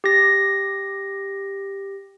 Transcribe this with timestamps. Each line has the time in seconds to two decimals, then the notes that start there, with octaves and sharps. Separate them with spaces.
0.04 G4 A#6